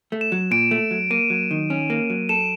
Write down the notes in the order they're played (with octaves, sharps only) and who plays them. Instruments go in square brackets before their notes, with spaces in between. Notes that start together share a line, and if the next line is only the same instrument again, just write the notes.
[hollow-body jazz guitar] A3
[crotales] E7
[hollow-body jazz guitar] F#3
[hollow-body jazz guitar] A#2 [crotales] D7
[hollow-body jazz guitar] A3
F#3
[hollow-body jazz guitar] A#3 [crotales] D#7
[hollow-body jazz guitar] F#3
D#3
C#4
A#3
F#3
[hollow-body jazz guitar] A4 [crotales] E7